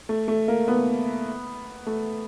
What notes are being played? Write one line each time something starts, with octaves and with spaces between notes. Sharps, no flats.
A3
A3
A#3
B3
A3